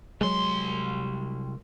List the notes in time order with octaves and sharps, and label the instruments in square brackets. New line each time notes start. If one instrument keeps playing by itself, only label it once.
[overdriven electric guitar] C2 C6 [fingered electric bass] F#3 G#3